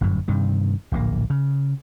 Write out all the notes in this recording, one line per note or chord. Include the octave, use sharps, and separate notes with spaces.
G1 F#2 A2
G2 C3 D#3
D1 A#1 A#3
C#3